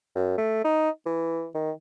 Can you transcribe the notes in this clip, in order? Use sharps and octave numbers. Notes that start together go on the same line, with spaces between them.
F#2
A3
D#4
E3
D#3